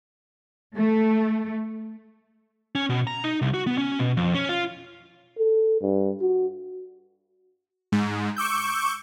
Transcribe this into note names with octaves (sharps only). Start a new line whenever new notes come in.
A3
C#4
B2
A#5
D#4
C2
F#4
B3
C#4
B2
F2
C#4
F4
A4
G2
F#4
G#2
C#6 D6 E6 G6